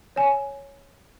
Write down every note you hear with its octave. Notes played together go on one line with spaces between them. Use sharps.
C#5 G#5